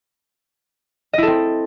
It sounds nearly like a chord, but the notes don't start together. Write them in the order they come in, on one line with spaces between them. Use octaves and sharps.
D#5 E4 A4 C4